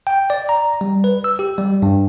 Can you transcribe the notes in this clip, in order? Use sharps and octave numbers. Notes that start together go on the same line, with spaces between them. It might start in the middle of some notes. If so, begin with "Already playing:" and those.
G5
D5
A#5
G3
B4
E6
G4
G3
G2